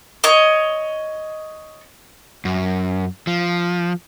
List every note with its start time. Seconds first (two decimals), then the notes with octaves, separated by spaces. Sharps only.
0.24 C#5 D#5
2.45 F#2
3.27 F3